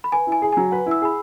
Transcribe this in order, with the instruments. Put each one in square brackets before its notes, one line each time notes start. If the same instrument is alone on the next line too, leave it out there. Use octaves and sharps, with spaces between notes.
[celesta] B5
[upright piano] B4 [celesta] G#5
[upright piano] E4
[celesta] G#5
[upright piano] G#4
[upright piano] F#3 [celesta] G#5
[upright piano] B4 [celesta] F#5
[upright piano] E4
[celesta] E6
[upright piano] G#4 [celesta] B5